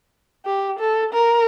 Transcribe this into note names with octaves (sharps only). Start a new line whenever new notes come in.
G4
A4
A#4